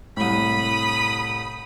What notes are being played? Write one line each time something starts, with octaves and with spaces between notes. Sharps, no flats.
C2 A2 B5 D#6